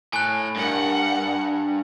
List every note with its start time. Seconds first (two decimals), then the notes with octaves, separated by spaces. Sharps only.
0.13 A2 G#5 F#6
0.56 G2 A#4 F#5 C#7